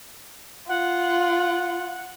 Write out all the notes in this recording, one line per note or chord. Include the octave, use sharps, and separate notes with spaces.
F4 F#5